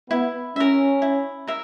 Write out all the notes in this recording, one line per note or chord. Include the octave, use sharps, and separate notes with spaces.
B3 E4
C#4 A#4 E5
E4
A#4 E5